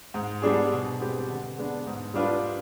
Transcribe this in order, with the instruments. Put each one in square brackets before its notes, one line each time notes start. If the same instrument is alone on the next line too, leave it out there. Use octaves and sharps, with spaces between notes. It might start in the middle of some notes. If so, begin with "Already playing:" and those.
[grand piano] G#2
G3 B3 D4 G#4
B2
G#3 C4 G4 B4
D3
G#3 B3 D4
G#2
G3 D4 F4 B4